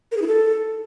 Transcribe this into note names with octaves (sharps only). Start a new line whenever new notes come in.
A#4
G#4
E4
A4